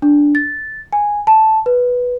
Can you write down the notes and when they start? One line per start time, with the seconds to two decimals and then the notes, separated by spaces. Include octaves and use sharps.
0.02 D4
0.35 A6
0.93 G#5
1.27 A5
1.66 B4